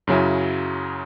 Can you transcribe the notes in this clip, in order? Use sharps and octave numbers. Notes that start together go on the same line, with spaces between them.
F#2 C#3 F#3 C#4 E4